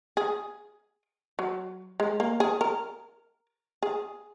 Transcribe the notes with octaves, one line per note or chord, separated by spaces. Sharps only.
G#4
F#3
G#3
A#3
G#4
A#4
G#4